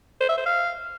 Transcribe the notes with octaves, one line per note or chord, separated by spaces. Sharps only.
C5
E5
C5
F5